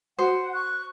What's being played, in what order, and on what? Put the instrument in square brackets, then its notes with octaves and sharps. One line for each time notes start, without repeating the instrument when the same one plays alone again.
[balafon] F#4 [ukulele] C5 [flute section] F#5
[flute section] C#6 F#6